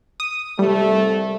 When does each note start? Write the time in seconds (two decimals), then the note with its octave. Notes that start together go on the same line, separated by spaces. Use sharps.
0.20 D#6
0.59 C2 G3 A3